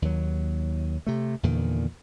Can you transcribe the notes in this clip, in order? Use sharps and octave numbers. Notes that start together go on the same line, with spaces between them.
D#2 F#3
C3 A3
E2 A#2 D3 D#3